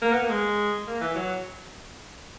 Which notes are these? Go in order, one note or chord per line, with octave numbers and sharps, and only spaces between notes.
A#3
B3
A#3
G#3
A#3
E3
F#3